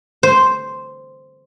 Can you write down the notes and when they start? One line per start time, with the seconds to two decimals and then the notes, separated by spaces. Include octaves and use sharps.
0.23 C5